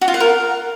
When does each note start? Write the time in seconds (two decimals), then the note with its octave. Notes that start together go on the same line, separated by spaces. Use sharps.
0.01 F#4
0.08 F4
0.14 F#5
0.20 A#4